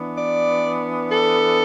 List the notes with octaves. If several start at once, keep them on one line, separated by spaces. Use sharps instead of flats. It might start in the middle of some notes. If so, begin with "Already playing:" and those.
Already playing: E3 B3 D4
D5
A4